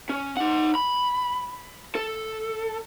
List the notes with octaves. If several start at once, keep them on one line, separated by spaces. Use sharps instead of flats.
C#4
D#4 F#5
B5
A4